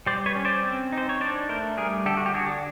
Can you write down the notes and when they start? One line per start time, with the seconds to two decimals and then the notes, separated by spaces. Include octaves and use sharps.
0.06 G3 C5 D5
0.26 B4 C#5
0.35 C#4
0.45 C5 D5
0.64 C4
0.92 D#4
0.98 C5
1.09 C#5
1.20 D4 C5 D5
1.49 A3 A#4 C5
1.77 G3 G#4 A#4
2.06 D3 G4 A4
2.17 F#4
2.26 G4
2.34 D4 F#4 G#4